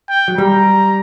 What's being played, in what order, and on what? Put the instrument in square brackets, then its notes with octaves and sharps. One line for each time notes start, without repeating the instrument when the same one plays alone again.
[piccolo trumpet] G5
[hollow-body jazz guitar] F#3
[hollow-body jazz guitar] G3 [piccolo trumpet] A#5